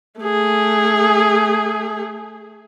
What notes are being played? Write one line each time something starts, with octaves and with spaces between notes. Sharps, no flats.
A3 G#4